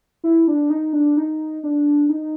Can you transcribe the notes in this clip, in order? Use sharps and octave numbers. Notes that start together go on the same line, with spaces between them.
E4
D4
D#4
D4
D#4
D4
D#4